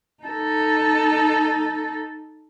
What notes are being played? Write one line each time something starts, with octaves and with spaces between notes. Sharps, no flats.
D#4 A4